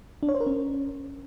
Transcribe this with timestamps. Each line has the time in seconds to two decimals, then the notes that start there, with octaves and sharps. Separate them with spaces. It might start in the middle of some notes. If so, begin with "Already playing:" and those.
0.23 D4
0.29 C#5
0.35 C5
0.40 A#4
0.46 C#4